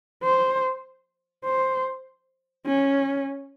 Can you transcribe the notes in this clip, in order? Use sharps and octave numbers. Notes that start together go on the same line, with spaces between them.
C5
C5
C#4